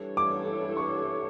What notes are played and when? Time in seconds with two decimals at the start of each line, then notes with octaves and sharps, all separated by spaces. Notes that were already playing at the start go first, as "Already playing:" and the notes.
Already playing: E3 G3 D4 A4 C#5
0.17 D6
0.77 C#6